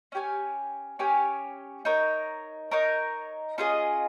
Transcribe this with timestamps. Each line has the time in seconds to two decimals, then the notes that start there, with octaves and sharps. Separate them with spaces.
0.12 C#4 G4 C#5 G#5
0.99 C#4 G4 C#5 G#5
1.85 D#4 A#4 C#5
2.71 D#4 A#4 C#5
3.58 C#4 F4 G#4 D#5